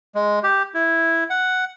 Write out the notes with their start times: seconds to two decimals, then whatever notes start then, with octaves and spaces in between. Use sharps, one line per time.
0.15 G#3
0.44 G4
0.74 E4
1.30 F#5